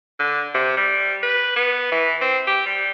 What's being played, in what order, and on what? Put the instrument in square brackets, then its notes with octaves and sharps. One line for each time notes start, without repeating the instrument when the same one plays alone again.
[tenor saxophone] D3
C3
G3
B4
B3
E3
C4
G4
G3